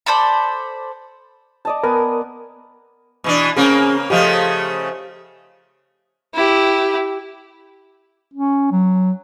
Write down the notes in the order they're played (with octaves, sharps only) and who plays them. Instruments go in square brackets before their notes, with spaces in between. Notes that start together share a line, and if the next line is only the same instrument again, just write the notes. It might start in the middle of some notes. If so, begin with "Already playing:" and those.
[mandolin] A4 C5 D5 B5
[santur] D5 D#5 A5
[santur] B3 G#5 [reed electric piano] A#4
[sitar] B2 E3 D4
[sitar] C#3 A#3 C4 [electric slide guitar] C#4 G#4
[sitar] C#3 F3 A3 [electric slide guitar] G4 D#5 F5
[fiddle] E4 G4
[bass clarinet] C#4
F#3